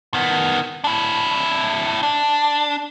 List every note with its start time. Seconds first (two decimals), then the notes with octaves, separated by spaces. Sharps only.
0.14 D#3 B3
0.84 D4 E4
2.03 D4